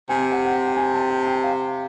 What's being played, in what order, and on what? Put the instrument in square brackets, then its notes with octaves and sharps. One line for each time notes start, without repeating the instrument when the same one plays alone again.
[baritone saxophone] C3 [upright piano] G#5
[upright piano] F#5
F#5
G5
G5
G#5
A5
G5
G5
F5